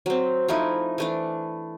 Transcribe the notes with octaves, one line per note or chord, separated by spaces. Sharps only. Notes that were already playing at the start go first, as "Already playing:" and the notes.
F#3 C4
F3 A3 D#4 E4
E3 A3 D4